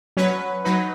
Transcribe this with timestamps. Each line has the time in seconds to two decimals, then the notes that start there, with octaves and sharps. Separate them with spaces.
0.17 F#3 C#4 B4
0.65 F#3 D#4 B4